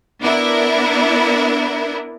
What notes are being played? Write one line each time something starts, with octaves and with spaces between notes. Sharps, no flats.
B3 D4 E4 A#4